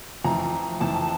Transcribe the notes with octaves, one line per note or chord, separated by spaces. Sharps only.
F2 E3 A3 A#5
F2 E3 A3 A5